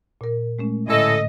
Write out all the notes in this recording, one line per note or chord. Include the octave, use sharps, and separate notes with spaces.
A#2 A#4
G#3 A3 C#4
A2 D3 C#4 E4 A4 D#5